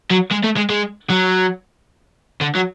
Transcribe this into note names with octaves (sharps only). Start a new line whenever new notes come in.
F#3
G#3
A3
G#3
G#3
F#3
D3
F#3